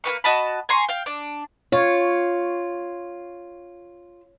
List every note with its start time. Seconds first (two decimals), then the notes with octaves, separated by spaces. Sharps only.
0.04 A#3 F#4 B4 C#6
0.24 F#4 D#5 A5 B5
0.69 G#5 A#5 C6 C#6
0.88 F5 G5
1.06 D4
1.72 F4 C#5